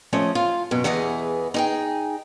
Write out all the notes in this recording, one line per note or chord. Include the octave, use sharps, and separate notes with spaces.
F3 A3 C#4 D#5
F4
F#2 B2
E2 E3 B3 G#4 D#5
D#4 G#4 G5